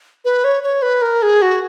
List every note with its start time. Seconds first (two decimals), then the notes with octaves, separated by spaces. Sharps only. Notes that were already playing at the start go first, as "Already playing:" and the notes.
0.25 B4
0.44 C#5
0.63 C#5
0.82 B4
1.02 A#4
1.22 G#4
1.42 F#4